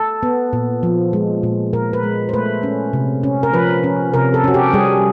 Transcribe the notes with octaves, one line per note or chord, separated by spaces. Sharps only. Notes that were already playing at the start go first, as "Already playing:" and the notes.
Already playing: A4
B3
A#2
F3
G#3
A#2
A#2 A#4
B4
G#3
C5
A3 B4
C#4
C3
C#4
A#4
F3 B4
C#4
C3 A#4
A4
C#4 F#4
G4
G3 G#4